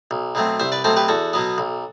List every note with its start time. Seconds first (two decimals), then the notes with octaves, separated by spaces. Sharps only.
0.11 B1
0.35 B2 F#3 A3 C4
0.60 C2 C5 E5
0.72 B4 D5
0.84 B2 F#3 A3 C4 A4 C5
0.97 G4 B4
1.08 E2 F#4 A4
1.33 B2 F#3 B3
1.58 B1